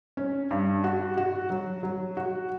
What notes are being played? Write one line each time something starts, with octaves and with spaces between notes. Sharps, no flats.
C#4
G2
F#4
F#4
F#3
F#3
F#4